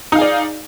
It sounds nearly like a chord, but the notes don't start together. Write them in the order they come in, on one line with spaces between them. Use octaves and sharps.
D#4 F5 G#4 D5